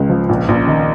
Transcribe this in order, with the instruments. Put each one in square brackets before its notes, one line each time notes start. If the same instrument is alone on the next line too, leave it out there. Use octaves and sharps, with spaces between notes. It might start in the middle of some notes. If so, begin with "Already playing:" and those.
Already playing: [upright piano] C#2 G#3
F3
A#1
A#1
D#3